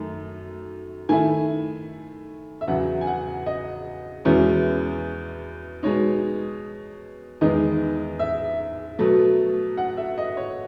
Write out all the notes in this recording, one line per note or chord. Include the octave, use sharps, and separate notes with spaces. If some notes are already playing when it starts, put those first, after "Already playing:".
Already playing: F#2 D#3 A3
D#3 A3 E4 G#5
E5
E2 C#3 F#3 F#5
G#5
F#5
D#5
E2 B2 G#3 C#4 E4
B2 G#3 D#4 C#5
E2 D#3 G#3 B3 D#4 D#5
E5
B2 F#3 A3
F#5
E5
D#5
C#5